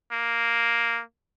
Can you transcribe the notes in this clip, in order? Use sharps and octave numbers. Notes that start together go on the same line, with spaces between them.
A#3